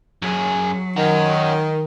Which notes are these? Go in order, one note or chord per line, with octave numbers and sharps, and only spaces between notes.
F#2 F#3 G#4
D#3 C#4 F#4